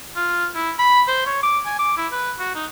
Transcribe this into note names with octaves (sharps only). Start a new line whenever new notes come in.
F4
E4
B5
C5
C#5
D6
G#5
D6
E4
B4
F#4
D#4